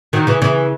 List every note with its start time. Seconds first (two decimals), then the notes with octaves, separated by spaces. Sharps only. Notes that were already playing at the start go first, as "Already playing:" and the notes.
0.13 D#3 F#3
0.27 C#3 E3
0.42 C#3 E3